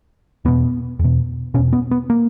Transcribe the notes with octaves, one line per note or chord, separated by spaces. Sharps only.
E2 B2 B3
E2 B2
E2 B2 C#4
B3
B3
A#3